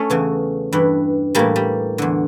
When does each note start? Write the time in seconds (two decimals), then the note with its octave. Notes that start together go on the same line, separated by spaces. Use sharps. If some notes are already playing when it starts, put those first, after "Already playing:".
Already playing: A3 C#4
0.10 E2 C#3 E3
0.73 G2 E3
1.35 A2 E3 G3 A#3
1.56 G3
1.98 E2 D3